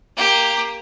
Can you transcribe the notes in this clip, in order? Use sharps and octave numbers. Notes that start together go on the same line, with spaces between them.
A#3 G4